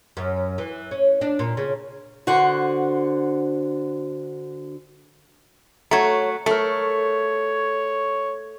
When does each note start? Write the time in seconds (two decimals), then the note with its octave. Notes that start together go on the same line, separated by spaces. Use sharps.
0.17 F#2
0.58 E3
0.91 C#4
1.21 D4
1.39 A#2
1.57 C#3
2.27 D3 F#4 C5 F#5
5.91 A3 F#4 C#5 A#5
6.46 A3 A4 A#4 C#5